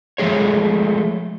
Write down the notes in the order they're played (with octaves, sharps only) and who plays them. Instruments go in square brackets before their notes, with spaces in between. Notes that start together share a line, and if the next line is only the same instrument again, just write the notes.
[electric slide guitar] F3 G#3 A3 G#4 C#5